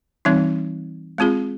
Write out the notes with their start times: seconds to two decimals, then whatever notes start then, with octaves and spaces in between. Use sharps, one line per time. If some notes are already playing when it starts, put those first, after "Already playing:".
0.25 E3 G3 C4 D#4
1.18 G#3 C4 F4 G#4